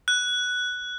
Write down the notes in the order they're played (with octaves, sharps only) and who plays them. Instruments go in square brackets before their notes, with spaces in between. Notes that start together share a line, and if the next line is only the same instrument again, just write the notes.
[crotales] F#6